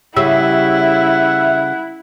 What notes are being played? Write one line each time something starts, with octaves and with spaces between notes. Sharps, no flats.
C#3 G3 E4 E5 F#5